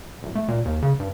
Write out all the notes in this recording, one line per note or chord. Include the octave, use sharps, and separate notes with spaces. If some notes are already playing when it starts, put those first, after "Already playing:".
D1
A3
A#2
D#2
C#3
G2